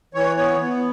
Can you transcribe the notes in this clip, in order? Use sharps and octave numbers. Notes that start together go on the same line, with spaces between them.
E3 C#5
B3 C#5
B3